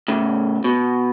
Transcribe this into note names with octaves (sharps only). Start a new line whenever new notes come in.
A2 C#3
B2